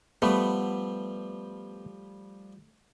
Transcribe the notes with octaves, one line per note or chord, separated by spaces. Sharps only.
F3 G3 A3 B3